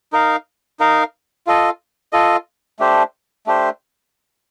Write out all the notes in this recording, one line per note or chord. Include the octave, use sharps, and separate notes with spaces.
D#4 A#4 F5
D#4 A#4 F5
F4 A4 D#5
F4 A4 D#5
A3 D4 G4 C5
A3 D4 G4 C5